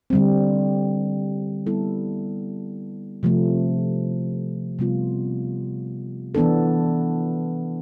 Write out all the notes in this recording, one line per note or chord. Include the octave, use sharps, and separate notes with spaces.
D3 G3 C4
G3 B3 E4 A4
C3 F3 A3
C3 G3 B3 F4
E3 B3 D4 A4